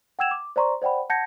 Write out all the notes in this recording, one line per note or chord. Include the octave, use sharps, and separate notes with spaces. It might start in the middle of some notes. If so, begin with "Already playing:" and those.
F#5 G5 E6 G#6 E7 F7
D6
C5 D5 A#5 C6 C#6
C5 D5 F#5 G5 B5
F#5 A5 G6 G#6 A#6 C#7